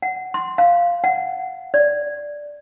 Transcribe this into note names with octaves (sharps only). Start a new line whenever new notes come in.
F#5
C6
F5
F#5
D5